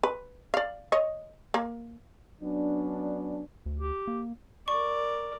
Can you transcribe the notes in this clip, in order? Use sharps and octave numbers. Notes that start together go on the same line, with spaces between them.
B4
D5 F5
C#5 D#5
A#3
F#3 B3 C#4 D4
D2
G4
A#3
A#4 D5 C#6